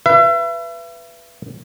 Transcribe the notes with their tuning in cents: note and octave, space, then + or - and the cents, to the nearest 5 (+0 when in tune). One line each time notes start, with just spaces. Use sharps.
B4 +0 E5 +40